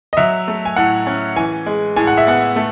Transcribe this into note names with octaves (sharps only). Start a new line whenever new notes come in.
D#5
F#3 E5
A3
G#5
A2 F#5
C#4
E3 G#5
G#3
A2 G#5
F#5
E5
B3 F#5
A3